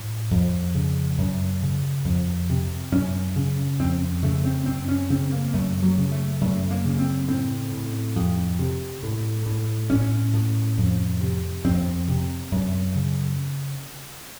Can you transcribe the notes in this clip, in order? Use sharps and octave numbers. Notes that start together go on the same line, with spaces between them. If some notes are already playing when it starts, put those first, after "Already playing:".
Already playing: A2
F2
C#3
F#2
C#3
F2
C3
F#2 C#4
C#3
F2 C4
C#3 A3
C4
F#2 C4
C#4
C#3 C4
A#3
F#2 A3
F#3
C#3
A3
F#2 A3
A#3
C#3
C4
A2 C4
A2
F2
C3
A2
A2
A2 C#4
A2
F2
C3
F2 C4
C3
F#2
C#3